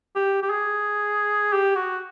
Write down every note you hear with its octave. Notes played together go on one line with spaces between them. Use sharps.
G4
G4
G#4
G4
F#4